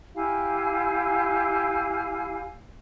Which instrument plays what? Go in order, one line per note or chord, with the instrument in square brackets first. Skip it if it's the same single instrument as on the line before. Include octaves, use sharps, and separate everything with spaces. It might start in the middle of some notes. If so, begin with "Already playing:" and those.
[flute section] E4 G4 F5 G#5